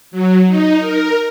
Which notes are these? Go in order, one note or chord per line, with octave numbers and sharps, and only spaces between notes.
F#3
D#4
A#4